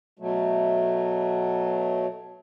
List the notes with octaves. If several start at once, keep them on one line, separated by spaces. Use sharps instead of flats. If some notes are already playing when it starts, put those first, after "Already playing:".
B2 F#3 A3